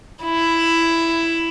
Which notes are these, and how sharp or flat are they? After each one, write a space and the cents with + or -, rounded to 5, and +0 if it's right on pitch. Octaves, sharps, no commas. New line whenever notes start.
E4 +10